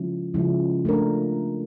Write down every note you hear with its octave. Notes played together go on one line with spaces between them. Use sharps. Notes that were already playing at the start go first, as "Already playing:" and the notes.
Already playing: C#3 F3 G#3 C#4 E4
C#3 F3 G#3 C#4 E4
A3 D4 F4 A#4